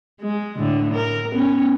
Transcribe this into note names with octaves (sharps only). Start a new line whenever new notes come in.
G#3
A2 D3
A#4
B3 C#4